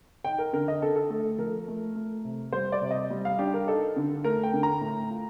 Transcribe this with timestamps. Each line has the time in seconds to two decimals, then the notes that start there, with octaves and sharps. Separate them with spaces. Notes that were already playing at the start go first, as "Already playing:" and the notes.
0.25 D#4 G5
0.38 A#4
0.53 D3 A#4
0.68 D#5
0.82 D3 A4
0.96 A4
1.10 A3 A4
1.38 F3 A#4
1.68 A3
1.95 A3
2.25 C3
2.52 G3 C5
2.72 D5
2.81 C3
2.91 D#5
3.10 G3
3.25 F5
3.39 D4 G4
3.54 A#4
3.67 D#4 A4
3.96 D3
4.24 A3 A#4
4.43 G5
4.53 D3
4.63 A#5
4.81 A2
5.11 F4